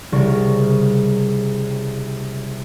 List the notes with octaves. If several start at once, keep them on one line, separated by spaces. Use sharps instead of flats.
C2 C#3 G3 A#4 D5 C#6